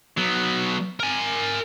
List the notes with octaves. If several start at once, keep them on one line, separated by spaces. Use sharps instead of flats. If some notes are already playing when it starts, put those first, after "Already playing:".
F#3 B3
A#4 G#5